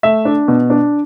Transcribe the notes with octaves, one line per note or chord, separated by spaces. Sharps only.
A3 E5
D4
B2
D4